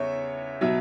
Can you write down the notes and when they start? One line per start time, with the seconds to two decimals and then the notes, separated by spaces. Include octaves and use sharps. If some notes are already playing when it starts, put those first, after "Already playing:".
Already playing: E2 C#3 C#5 E5
0.61 B2 F#3 E5